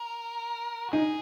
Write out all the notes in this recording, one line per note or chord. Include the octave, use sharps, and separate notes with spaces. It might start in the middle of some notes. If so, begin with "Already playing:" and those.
Already playing: A#4
F#4
D#4 G#4